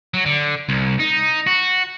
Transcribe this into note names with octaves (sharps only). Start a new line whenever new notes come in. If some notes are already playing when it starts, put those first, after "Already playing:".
F#3
D3
C2
D#4
F#4